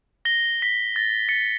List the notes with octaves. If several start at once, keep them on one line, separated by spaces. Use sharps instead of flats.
A#6 G7
B6
A6 A#6
A6 C#7